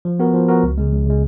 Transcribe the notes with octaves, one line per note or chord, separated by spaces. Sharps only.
F3
B3 F#4 A#4
F3
B3 F#4 A#4
C#2
C#3 G#3
C#2
C#3 G#3